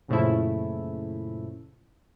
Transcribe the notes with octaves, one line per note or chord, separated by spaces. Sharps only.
F#2 A#2 C#3 F3 A3 E4